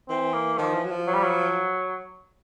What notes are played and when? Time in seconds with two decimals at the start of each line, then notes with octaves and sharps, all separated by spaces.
0.09 E3 C4
0.33 A#3
0.58 D#3 F3
0.75 E3
0.85 F#3
0.91 F3
1.07 F#3
1.14 G3
1.23 F#3